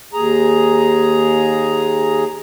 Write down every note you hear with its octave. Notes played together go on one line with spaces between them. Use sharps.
D#2 G#4 A#5